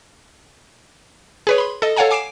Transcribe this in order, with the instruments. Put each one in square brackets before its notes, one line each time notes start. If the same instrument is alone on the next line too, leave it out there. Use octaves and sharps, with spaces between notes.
[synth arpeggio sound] G#4 B4 C#5
B5 C6
A4 D#5
A4 C#5 F5 F#5 G#5 A#5
G#5 D6 C7 D7 E7